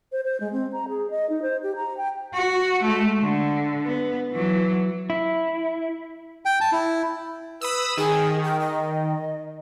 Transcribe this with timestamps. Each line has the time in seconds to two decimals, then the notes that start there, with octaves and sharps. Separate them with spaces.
0.12 C5
0.23 C5
0.40 G#3
0.52 C4
0.73 A#5
0.89 G#4
1.11 D#5
1.29 D#4
1.42 C5
1.63 G4
1.76 A#5
1.97 G5
2.34 F#4
2.82 G#3 A3
3.20 D3
3.85 B3
4.33 E3 F#3
5.10 E4
6.45 G5
6.61 A5
6.72 E4
7.61 B4 B5 D#6 E6
7.97 D#3 G#4
8.44 G5
8.60 D#5